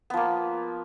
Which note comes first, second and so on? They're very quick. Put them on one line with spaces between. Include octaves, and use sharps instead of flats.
B3 F3 A#3